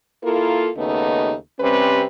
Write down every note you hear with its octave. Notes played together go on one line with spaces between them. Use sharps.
A#3 E4 F4 A4 A#4
D#2 C#3 A3 B3 D#4
C3 G3 C4 C#4 B4